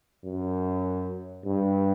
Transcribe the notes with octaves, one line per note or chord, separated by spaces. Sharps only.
F#2
G2